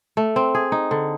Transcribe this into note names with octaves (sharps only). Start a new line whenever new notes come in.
A3
C4
G#4
D#4
D3